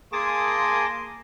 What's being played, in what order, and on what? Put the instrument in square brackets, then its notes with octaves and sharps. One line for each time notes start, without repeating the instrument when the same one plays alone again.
[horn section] A#3 C6 [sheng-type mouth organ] G#4 G#5 D#6 [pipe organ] A5 D6 A#6